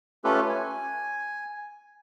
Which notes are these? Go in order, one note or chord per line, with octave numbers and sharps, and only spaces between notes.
A3 C#4 F4 G4 A4 B4
G#5